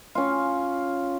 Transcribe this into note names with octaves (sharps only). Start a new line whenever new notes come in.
C#4 F4